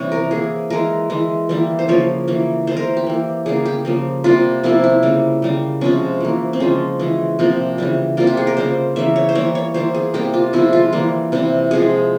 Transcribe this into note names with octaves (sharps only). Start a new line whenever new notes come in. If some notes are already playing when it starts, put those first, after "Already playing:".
Already playing: C3 E3 G3 A#3 C#5
A#4
E3 A#3 G#4
E3 G#3 A#4
E3 G#3
E3 G3 A#3
C5
C#3 F3 A#3 C#5
E3 A#3
E3 G#3 C5
A#4
G4
E3 A#3
C#3 G3 A#3 G#4
G4
C#3 F3 A#3
C3 G3 A#3 F4
C3 F3 A#3 E4
E4
C#3 G3 A#3
C#3 G3 A#3
C3 F3 G#3 C#4
E3 A#3
C4
C#3 F3 G#3 C#4
E3 G#3
C3 F3 A#3
C#3 E3 G3
C3 G3 A#3 F4
G4
G#4
A#4
C#3 G3 A#3 C5
C#3 E3 A#3 E5
C#5
C5
E3 G3 A#3 C#5
C#5
E3 G3 A#3 C5
G#4
C3 G3 A#3 G4
F4
C3 F3 G#3 E4
F4
E3 G3 A#3
C3 E3 G3
C3 F3 G#3 G#4